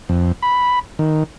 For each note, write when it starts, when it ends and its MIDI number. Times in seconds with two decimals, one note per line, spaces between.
0.09 0.32 41
0.42 0.79 83
0.99 1.24 51